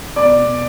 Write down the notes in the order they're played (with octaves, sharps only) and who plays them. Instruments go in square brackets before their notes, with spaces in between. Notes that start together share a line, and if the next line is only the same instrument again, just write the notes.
[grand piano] B2 [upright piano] D5
[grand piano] B2